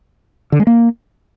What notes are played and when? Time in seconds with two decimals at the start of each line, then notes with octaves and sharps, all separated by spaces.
0.52 D3
0.60 G#3
0.67 A#3